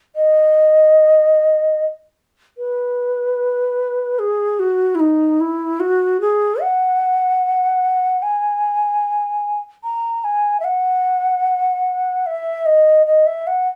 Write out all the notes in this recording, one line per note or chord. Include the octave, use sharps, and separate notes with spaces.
D#5
B4
G#4
F#4
E4
D#4
E4
F#4
G#4
F#5
G#5
A#5
G#5
E5
F#5
E5
D#5
D#5
E5
F#5